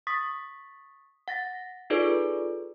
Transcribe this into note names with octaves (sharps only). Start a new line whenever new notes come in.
C#6 D#6 A6 B6
F#5 A6 A#6
D#4 F4 G#4 A4 B4 D5